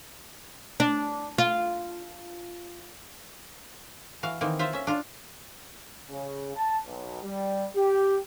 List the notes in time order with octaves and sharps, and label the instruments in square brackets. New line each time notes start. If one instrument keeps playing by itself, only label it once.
[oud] D4
F4
[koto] E3 F#4 F5
D#3 E3 A#3 C4
F4 C5 E5
C#4 E5
D4 F4
[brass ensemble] C#3
A5
B1
G3
G4